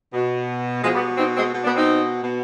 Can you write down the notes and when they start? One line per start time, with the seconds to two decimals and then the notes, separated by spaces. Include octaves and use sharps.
0.13 B2
0.82 B2 F3 G#3
0.93 G3 B3
1.17 C4 D#4
1.35 G#3 C4
1.53 B2
1.64 B3 D4
1.75 C4 D#4
2.23 B2